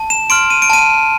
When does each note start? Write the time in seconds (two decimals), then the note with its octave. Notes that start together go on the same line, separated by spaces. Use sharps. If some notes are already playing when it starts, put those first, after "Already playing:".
Already playing: A5
0.10 E7
0.30 C6 F6 D7
0.50 D#7
0.62 D7
0.70 A5 D#7